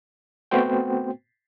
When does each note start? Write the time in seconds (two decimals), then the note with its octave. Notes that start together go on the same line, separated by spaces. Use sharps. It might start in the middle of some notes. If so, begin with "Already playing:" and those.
0.51 A3 B3 C4 F#4 C5 G5